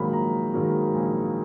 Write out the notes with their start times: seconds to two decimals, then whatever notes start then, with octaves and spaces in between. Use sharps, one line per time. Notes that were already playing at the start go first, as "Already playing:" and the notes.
Already playing: A#1 G#2 D#3 F#3 A#3 B5
0.12 A#1 A#5
0.54 G#2 D#3 F#3 A#3
0.94 A#1